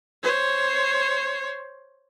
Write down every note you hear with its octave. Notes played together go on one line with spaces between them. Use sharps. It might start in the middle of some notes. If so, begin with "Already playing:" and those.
C5 C#5